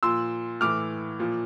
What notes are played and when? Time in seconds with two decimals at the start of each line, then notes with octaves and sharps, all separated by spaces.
0.03 A#2 F3 C6 E6
0.61 A2 E3 D6 F6
1.19 A#2 F3